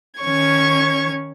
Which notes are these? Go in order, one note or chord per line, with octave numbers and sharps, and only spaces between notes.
D#3 C#4 C#5 C#6 G#6